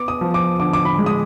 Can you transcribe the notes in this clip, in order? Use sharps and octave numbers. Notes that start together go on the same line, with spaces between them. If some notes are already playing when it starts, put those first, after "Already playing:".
Already playing: B3 D6
D#6
F3
D6
D3 D6
D6
B5
G#3
D#6